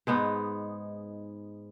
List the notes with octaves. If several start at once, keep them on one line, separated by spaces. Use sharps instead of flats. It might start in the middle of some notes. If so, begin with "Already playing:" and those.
G#2 G#3 B3 D#4